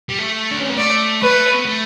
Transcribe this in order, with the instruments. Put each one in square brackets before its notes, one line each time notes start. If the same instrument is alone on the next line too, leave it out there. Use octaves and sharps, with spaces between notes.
[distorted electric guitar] G3
A3
D4
C#4
B3
[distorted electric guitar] A3 [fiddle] D5
[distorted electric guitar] A3 [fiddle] B4
[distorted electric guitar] B3
A3